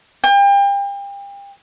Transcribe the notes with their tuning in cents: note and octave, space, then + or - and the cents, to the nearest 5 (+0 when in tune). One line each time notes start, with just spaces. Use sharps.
G5 +35